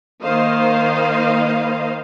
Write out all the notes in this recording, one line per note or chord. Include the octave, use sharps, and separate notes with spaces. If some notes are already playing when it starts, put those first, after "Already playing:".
D#3 A#3 C5 D#5 F5